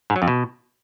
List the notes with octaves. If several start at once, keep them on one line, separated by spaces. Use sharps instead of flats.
G#2
F#3
F2
B2